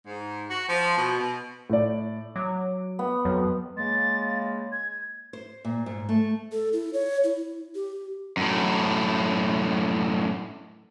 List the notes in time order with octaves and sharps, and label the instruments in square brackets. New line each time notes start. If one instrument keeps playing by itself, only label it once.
[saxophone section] G#2
F#4
F3
B2
B2
[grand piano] A2 D5
[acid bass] F#3 [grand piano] D6
[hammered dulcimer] B3
[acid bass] F2 [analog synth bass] F#3
[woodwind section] C#3 G#3 A#3 [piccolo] A6
[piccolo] G#6
[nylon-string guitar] C5
A#2
G#2
A3
[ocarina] A4
E4
C#5
E4
G4
[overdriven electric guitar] F#2 A2